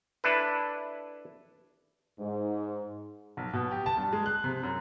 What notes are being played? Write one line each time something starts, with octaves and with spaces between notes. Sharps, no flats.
D4 E4 A4 B4
G#2
B1
B2
G4
A5
G2
G#3
F#6
C3
F#2